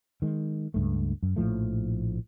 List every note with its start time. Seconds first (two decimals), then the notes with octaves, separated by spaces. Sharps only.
0.22 D#3 G#3
0.74 C#2 G2 A3
1.23 F#2
1.36 A#1 A2 F3 A3